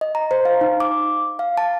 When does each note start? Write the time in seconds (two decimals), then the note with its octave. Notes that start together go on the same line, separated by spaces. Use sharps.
0.01 D#5
0.15 A#5
0.31 C5
0.45 F5
0.61 D#4
0.80 D6
1.39 F5
1.57 A5